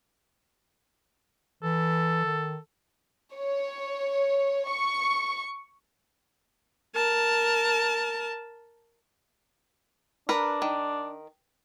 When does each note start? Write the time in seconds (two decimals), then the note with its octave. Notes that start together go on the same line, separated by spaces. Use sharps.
1.63 E3 A4
2.25 D#3
3.33 C#5
4.68 C#6
6.95 A#4 A5
10.29 D4 A#4 B4
10.62 D#3